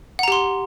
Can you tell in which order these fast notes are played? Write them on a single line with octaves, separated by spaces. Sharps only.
F#5 A#5 G4 C6